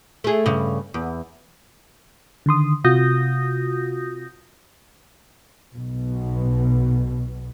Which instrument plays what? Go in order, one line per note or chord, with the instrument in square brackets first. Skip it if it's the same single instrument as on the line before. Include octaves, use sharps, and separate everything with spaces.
[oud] A3 G#4
G2 C#3
E2
[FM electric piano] D3 D#3 C6 D#6
C3 F4 F#4 D#6 G6 A#6
[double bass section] B1 B2